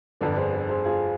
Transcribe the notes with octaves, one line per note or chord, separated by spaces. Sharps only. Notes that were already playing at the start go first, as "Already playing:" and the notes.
G1 F2 D3 B4 D5
G#4 C5
G#4 C5
G#4 C5
F4 G#4